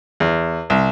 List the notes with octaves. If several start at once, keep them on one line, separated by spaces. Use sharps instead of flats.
E2
C2